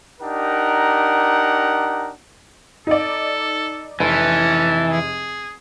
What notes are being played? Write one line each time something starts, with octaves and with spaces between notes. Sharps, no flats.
D4 D#4 G4 A#4 F#5
D#4 A4 D5
F1 E3 C#4 A5
G#4